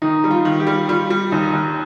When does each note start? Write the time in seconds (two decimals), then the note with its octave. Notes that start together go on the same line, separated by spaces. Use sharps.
0.02 D#3 D#4
0.24 G3
0.31 F4
0.45 D#3
0.60 G4
0.67 G3
0.88 G3 F4
1.10 G3
1.32 D#2 D#4
1.53 D#2